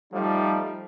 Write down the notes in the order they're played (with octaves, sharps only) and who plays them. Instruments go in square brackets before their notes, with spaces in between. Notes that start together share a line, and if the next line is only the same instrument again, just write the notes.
[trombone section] F3 G3 A3 D#4